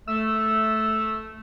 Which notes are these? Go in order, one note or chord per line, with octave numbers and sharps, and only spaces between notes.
A3 E6